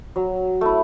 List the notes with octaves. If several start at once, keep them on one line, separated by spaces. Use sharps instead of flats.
F#3
A3 E4